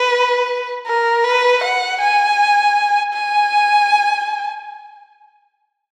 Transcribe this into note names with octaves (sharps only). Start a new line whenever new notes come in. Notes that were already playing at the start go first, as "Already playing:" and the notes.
Already playing: B4
A#4
B4
F#5
G#5
G#5